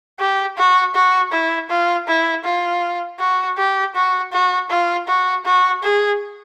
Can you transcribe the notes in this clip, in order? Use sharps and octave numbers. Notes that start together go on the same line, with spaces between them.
G4
F#4
F#4
E4
F4
E4
F4
F#4
G4
F#4
F#4
F4
F#4
F#4
G#4